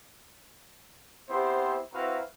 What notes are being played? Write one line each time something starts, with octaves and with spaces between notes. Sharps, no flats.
B3 C4 E4 G4 C5
C4 E4 F#4 B4 F5 A#5